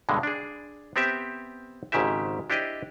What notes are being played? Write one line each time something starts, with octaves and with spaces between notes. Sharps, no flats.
G2 B2 D3 G#3 A3
D4 G#4
B3 C4 G4 E5
G#1 G#2 C#3 E4 G4 E5
D4 E4 G4 C5 D5 D#5